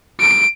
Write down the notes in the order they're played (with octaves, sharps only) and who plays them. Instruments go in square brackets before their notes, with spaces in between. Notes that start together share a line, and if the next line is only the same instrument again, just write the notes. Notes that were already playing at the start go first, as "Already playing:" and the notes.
[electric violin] D7